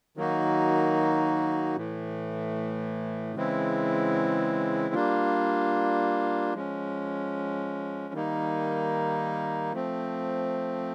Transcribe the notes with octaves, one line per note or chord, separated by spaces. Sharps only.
D#3 F#3 A#3 D#4 F#4
A2 E3 A3
C#3 E3 G#3 C4 E4
G3 A#3 D4 F4
F3 G#3 C#4
D#3 G3 A#3 D#4
F3 A3 C4